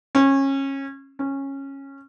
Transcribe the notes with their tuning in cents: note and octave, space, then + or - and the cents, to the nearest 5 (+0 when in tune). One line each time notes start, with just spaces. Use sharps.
C#4 -25
C#4 -15